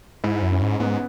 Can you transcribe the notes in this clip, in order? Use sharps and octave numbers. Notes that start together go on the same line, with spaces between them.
G#2 E4
F#2
C#4
G#2
G#2 B3